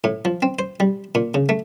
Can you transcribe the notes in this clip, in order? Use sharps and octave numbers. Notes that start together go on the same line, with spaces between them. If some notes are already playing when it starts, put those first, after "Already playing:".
A2
F3
C4
C5
G3
A#2
C#3
A3